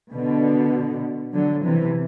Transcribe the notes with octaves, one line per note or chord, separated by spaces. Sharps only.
B2 D3
D3 F#3
C3 E3